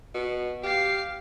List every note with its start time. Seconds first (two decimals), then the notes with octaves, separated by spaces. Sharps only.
0.14 B2
0.63 G4 F5 C7